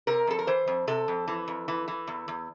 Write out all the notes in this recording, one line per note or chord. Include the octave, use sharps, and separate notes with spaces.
C3 A#4
F2 A4
A#4
E3 C5
F2
C3 A4
F2
E3
F2
E3
E3
E2
E2